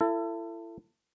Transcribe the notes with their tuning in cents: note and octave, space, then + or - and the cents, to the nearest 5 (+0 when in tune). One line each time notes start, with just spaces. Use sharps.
E4 +30 A4 +25